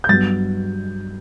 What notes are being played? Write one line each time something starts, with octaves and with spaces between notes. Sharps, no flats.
G6
G2 F#3 B3 A6